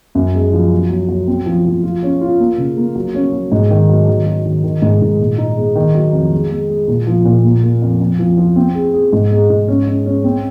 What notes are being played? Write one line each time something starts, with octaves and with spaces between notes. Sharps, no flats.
F#2
G#3
F3
F#3
F#3
F#3
C4
F3
F3
F4
C#4
F4
A#3
C#3
A#3
F#3
C#4
F#3
G#2
D#3
F#3
D#3
F#3
D#3
D#3
G#2
G#2
A#2
D#4
G#3
D#3
F#3
F2
G#3
G#3
G#3
A#2
F3
A#2
A#3
A#3
F2
F2
F3
F3
C4
G#4
G#4
G#2
G#3
G#2
C#4
C#4
C#4
C4